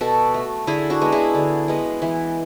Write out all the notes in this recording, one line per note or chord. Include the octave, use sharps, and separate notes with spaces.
B2 F#4 A4
A3
D3 E4 G#4
D4 F#4
G#3 B3
E4 G#4
D3
G#3 B3
E3